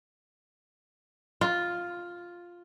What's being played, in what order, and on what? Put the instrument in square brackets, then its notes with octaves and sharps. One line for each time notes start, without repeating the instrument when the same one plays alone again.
[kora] F4